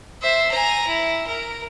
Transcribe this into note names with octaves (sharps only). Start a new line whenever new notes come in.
C5 E5
G#5 A#5
E4
A#4